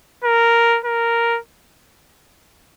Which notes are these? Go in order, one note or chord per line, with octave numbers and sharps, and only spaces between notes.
A#4
A#4